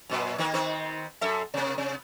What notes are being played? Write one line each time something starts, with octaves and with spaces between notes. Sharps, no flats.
F#2 A#2 B4
D#3 A#3 B3
D#3 B3 C4
F#2 A4 E5
C3 A#3
C3